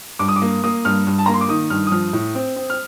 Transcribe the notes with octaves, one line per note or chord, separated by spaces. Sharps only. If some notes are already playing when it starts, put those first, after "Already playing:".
G2 D6
D#6
D6
A#3
A#3 D#6
G2 F6
G2
A5
A#3 A#5
C6
D6
D#3 D#6
G2 F6
D#6
F3 F6
A2
C4
C4
F6